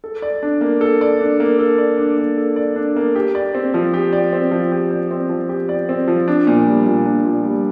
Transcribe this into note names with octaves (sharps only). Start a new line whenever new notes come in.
A4
D5
D4
A#3
A4
D5
D4
A#3
A4
D5
D4
A#3
A4
D5
D4
A#3
G4
D5
C4
F3
G4
D5
C4
F3
G4
D5
C4
F3
G4
D5
C4
F3
D4
A#2
G3
A#2
D4
A#2
G3